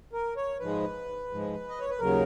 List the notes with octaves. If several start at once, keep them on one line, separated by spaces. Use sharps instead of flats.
A#4
C#5
G#2 F3 G#3 B4
G#2 F3 G#3
D#5
C#5
B4
D#2 C#3 F#3 A#4